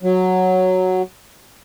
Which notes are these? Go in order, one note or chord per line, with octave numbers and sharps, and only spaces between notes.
F#3